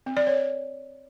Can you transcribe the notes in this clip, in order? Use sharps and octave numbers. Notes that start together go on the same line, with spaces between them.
C4
D5
C#5